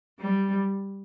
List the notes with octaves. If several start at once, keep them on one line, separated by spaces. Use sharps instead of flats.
G3